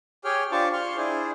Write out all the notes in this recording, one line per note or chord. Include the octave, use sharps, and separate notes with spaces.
G4 G#4 C#5 G5 F6
D4 F4 G4 C5 A5 C#6
F5 C6 C#6 F6
D4 E4 G#4 C5